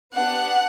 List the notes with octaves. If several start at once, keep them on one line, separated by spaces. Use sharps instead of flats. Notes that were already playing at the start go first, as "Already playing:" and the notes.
B3 D4 G4 F#5